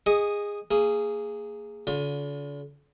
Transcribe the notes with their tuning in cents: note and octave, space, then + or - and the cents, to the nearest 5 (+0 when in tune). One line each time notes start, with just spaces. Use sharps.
G#4 -15 D#5 +0 C#6 +15
A#3 -30 G#4 +0
D3 -40 F4 +35